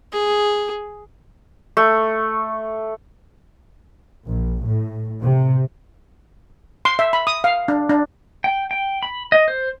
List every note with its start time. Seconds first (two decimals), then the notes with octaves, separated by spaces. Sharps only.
0.12 G#4
1.77 A3
4.27 A#1
4.64 A2
5.22 C3
6.85 C6
6.99 E5
7.13 B5
7.27 D#6
7.44 F5
7.68 D4
7.90 D4
8.44 G5
8.71 G5
9.03 B5
9.32 D#5
9.48 C5